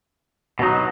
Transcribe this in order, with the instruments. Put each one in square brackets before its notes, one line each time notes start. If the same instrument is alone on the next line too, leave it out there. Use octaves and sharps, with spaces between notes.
[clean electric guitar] B2 F#3 D#4 [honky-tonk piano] F#4